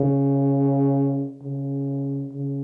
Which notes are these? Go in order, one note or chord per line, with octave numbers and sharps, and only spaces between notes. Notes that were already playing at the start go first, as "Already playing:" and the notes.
Already playing: C#3
C#3
C#3